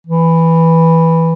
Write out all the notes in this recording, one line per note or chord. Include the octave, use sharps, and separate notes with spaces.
E3